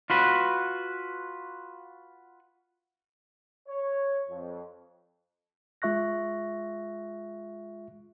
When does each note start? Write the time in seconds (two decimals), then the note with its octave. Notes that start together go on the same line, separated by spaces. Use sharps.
0.10 F4 F#4 B4
3.68 C#5
4.29 F2
5.82 G#3 F4 E5 C#6 F#6 A#6